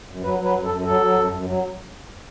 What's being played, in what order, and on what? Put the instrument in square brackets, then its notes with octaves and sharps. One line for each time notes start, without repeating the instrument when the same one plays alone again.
[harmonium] F#2
F#3 B4
F#3
B4
F#2
A4
F#2
F#3 A4
F#3
F#2
F#2
F#3